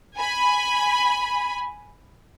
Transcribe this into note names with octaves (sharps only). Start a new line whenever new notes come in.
G#5 B5